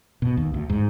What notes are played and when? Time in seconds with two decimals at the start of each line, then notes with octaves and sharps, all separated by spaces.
0.22 B2
0.37 D#2
0.54 D2
0.70 G#2